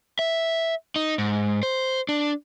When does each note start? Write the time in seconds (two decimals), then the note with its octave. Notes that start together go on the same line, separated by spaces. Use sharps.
0.19 E5
0.96 D#4
1.18 G#2
1.63 C5
2.09 D4